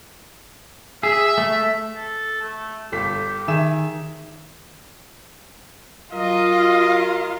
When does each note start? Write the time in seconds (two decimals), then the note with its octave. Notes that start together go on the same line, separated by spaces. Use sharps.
1.03 G#4 E5
1.38 A3
1.95 A4
2.42 A3
2.92 G1 G4 A4 B6
3.48 D#3 G#4 E5 E7
6.13 F#3 F4 A#4 D#5